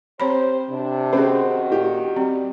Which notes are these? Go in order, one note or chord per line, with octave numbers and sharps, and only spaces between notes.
C4 G4 C5 C#5 B5
C3 D4
D#3 C4 C#4 F#4 G#4
A#2 G4
G3 C4